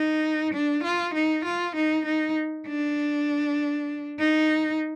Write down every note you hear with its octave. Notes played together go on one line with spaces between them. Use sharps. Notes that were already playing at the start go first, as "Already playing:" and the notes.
Already playing: D#4
D4
F4
D#4
F4
D#4
D#4
D4
D#4